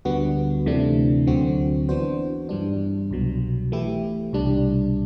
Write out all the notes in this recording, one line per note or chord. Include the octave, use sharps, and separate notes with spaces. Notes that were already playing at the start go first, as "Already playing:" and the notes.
D2 D3 G3 B3 F#4
D2 C3 E3 A3 D4
D2 D3 F#3 C4 F#4
E3 B3 D4 F#4 C5
G2 E3 G3 D4
C2 B2 F#3
E3 A3 E4 G4
C2 B2 G3 D4